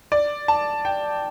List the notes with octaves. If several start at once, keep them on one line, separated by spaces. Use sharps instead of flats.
D5
A5
G5